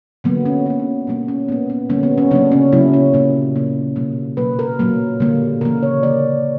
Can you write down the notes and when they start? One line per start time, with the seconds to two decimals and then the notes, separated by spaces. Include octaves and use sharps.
0.24 D3 F#3 A#3 B3
0.45 C#4
0.66 D3 A#3 C#4
0.79 D4
1.07 B2 G3 A#3 D4
1.28 C#4
1.48 A#2 A#3 B3
1.70 B3
1.89 D3 G3 A#3 C#4
2.03 B3
2.18 C#4
2.31 C#3 F#3 A#3 D4
2.52 C#4
2.73 C#3 F#3 A#3 E4
2.93 C#4
3.14 A#2 G3 A#3
3.56 C#3 F#3 A#3
3.96 B2 G3 A#3
4.37 B2 F#3 A#3 B4
4.59 A#4
4.79 A#2 F#3 A#3
5.20 D3 G3 A#3
5.61 C#3 E3 A#3 A#4
5.83 C#5
6.03 D3 A#3 D5